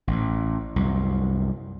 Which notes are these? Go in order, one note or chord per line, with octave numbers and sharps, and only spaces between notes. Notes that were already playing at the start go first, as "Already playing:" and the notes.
A1
C2 F#2